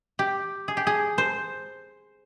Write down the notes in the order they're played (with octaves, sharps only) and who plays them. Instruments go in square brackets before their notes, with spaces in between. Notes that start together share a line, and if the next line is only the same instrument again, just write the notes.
[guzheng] G4
G#4
G4
G#4
C5